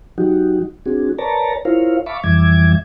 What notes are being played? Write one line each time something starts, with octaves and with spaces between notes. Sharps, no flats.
F#3 D#4 F#4 G4
C4 D4 F#4 G#4
A#4 B4 C#5 D5 A5 A#5
E4 F4 A#4 C5 C#5 F5
E5 F5 A5 B5 C#6 D6
F2 E3 G3 E5 D6 G#6